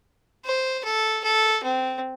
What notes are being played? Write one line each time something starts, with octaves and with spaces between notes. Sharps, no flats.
C5
A4
A4
C4